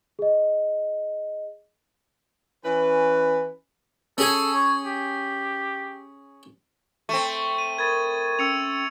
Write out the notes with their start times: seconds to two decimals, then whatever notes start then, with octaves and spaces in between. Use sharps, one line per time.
0.19 G#4 D#5
2.65 E3 C#4 B4
4.18 C#4 G#4 A4 G#5
4.54 C#5
4.84 G4
7.09 A3 C4 C#6
7.58 D#7
7.78 A#4 B5 D#6 G#6 A6 D#7
8.39 C#4 G5 E6 C#7 F7